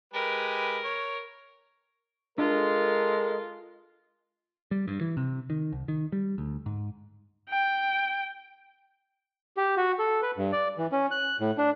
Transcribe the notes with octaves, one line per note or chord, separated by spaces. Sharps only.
G#3 G4 A#4 B4
C#5
G#3 D4 F4 A4 A#4
G3
G2
E3
C3
D#3
C2
D#3
G3
D2
G#2
G5
G4
F#4
A4
B4
G2
D5
E3
C#4
F#6
A2
D4